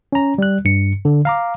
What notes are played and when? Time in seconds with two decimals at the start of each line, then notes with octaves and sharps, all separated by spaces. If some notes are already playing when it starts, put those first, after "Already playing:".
0.12 C#4 A#5
0.38 G3 F#6
0.65 G2 C#7
1.05 D3
1.25 F5 A#5 D6